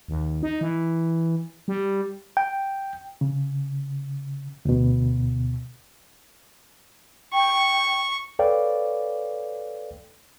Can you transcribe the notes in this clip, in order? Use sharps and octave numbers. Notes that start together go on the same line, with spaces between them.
D#2
D#4
E3
G3
G5
C#3
D2 B2
G5 C#6
A4 B4 C#5 D5 F5 G5